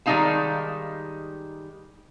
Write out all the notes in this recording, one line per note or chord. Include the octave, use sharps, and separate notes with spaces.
D#3 G3 G#3 D#4 F5 A5